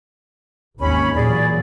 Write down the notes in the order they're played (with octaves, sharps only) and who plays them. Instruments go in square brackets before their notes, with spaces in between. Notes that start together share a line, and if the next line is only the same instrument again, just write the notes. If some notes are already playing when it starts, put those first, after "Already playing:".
[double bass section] G#1 D#2 [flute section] C#4 B5
[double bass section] A#2 E3 F#3 [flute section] G#4 D5